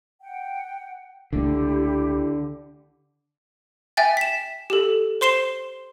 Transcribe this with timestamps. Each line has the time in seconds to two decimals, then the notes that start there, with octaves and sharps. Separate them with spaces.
0.21 F#5 G5
1.33 C#2 D3 A3 E4 G4
3.97 E5 G5 G#5 A6
4.17 B6 E7
4.70 G4 A4
5.21 C5 C6 C7 E7 G7